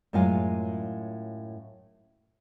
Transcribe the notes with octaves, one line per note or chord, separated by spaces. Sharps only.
F#2 A2 G#3 F4 F5 G#5